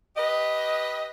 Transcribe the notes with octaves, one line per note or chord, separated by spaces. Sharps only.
G4 B4 D#5